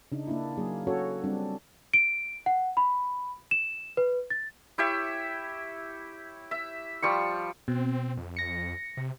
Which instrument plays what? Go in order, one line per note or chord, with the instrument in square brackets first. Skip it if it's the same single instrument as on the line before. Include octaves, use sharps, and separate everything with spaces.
[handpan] C#3 D4 D#4
A#3 D4 E4
F#3 A#3 G#4
C#4 F#4 A4 C#5
G3 C4 D4
[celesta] D7
F#5
B5
E7
B4
A6
[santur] E4 G4 C#5 E5
E5
F3 G3 C#6
[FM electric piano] B2 [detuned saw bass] C4
[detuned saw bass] F2
[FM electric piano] A#6 C#7
[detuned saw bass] C3